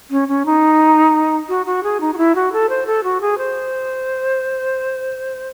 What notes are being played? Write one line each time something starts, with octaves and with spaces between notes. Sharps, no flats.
C#4
C#4
D#4
F#4
F#4
G#4
D#4
F#4
E4
F#4
A4
C5
A4
F#4
G#4
C5